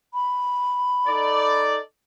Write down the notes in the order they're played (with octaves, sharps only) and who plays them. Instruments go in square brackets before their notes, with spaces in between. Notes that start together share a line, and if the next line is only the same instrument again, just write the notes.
[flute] B5
[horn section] D#4 A4 D5